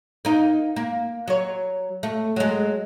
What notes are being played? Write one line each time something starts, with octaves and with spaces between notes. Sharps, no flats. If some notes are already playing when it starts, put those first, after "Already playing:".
A#3 D#4
A#3
F#3 C#5
A3
F#3 G#3